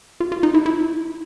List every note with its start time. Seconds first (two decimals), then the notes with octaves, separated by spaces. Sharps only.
0.20 F4
0.32 F4
0.43 D#4
0.54 E4
0.66 E4